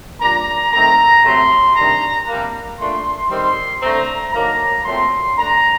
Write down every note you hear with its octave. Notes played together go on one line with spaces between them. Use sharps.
A#2 G3 D4 A#5
D#3 A3 C4 A#5
C3 F#3 A3 C4 C6
C3 D#3 G3 D4 A#5
C3 G3 A#3 D4
A#2 A3 D4 C6
D#3 G3 C4 C6
D3 A3 C4 A#5
D#3 F#3 A#3 D4 A#5
A#2 F#3 A3 C4 C6
D3 A3 D4 A#5